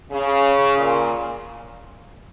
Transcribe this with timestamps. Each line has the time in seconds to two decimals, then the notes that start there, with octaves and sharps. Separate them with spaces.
0.12 C#3
0.77 A#2